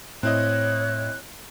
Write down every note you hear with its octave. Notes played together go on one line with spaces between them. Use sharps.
A2 C4 E4 C#5 D#5 F#6